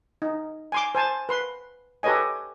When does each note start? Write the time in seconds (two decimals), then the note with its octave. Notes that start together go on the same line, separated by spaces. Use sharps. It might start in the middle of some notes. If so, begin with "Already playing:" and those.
0.22 D#4
0.72 G#5 C6 D6
0.95 C5 G#5 A5
1.29 B4 C6
2.03 G4 A4 B4 C#5 D#5 G#5